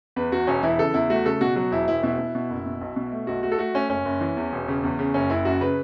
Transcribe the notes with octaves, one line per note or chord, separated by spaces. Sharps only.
E2 B4
E2 F#4
E1 C#4
E3 E4
C#3 A4
E2 E4
A3 F#4
C#3 A4
B2 F#4
F#3 F#4
E1 E4
E1 E4
B2 E4
B2
B2
F#1
B2
B1
B2
A3
B1 F#4
A3 F#4
A4
A3 F#4
A3 C#4
F#1 C#4
F#1
E3
E2
E1
C#3
E2
C#3
F#1 C#4
F#1 E4
F#2 F#4
C#3 B4